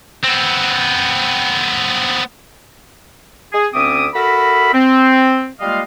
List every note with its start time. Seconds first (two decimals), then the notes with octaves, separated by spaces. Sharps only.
0.24 B3 C4
3.53 G#4
3.74 D2 C4 C#4 E5 D6 D#6
4.14 F#4 A4 A#4 E5 B5
4.74 C4
5.60 G3 G#3 A#3 F4 D#5 F5